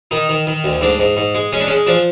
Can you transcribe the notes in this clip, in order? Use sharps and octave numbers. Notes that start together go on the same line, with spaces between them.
D#3 D#4
D#3
D#3
D2
G#2 D4
G#2
G#2
G#3
G#3 C#4
D4
C#4
G#3
F3 D4